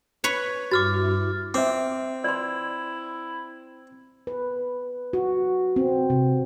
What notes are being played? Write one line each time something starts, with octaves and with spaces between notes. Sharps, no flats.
B4 C#5
G2 E4 F#4 D6 F6 A6
C4 E5 D6
E4 D5 C6
B4
F#4
C4
C3